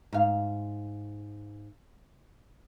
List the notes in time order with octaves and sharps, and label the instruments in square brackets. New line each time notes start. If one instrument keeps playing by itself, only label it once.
[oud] G#2 F5